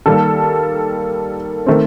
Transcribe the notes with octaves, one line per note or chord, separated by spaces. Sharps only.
D#3 G3 A#3 A4 A5
D#3 A3 C4